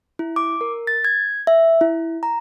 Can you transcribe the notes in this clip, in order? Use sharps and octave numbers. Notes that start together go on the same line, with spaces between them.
E4
D6
A#4
A6
G#6
E5
E4
A#5